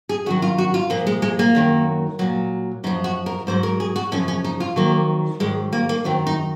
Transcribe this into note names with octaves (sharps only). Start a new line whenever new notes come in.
G#4
F#2 D#3 F#3 F#4
F4
F#4
F4
A#2 F3 A#3
G#3
G#3
A#3
F#2 D#3 F#3
A#2 F#3
F#2 F3 D#4
F#4
A#4
G#2 F#3 C5
A#4
G#4
F#4
F#2 C#3 F3 C#4
C#4
D#4
F4
F2 D#3 F#3 A#3
G#2 D#3 F#3 G#3
A#3
A#3
F#2 D#3 F#3 C4
D#4